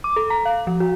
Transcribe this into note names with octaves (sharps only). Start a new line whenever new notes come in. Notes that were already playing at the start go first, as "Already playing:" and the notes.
D6
A4
A#5
F5
F3
F#4